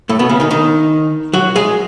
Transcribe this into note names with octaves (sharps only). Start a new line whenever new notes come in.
A2 A3
B2 B3
C#3 C#4
D#3 D#4
D#3 D#4
F#3 F#4
G#3 G#4